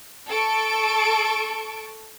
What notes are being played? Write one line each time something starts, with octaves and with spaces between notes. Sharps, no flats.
A4 A5 C#6 D7